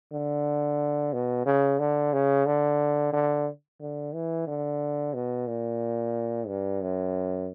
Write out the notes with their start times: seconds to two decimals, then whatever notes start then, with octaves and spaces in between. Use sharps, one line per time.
0.12 D3
1.13 B2
1.46 C#3
1.79 D3
2.13 C#3
2.46 D3
3.13 D3
3.80 D3
4.14 E3
4.47 D3
5.14 B2
5.47 A#2
6.47 G2
6.81 F#2